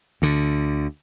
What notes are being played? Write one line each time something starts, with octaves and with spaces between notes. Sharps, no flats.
D2 D3